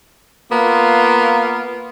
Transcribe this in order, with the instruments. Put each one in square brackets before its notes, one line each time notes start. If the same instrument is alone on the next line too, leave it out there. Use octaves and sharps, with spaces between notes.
[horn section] A#3 B3 F4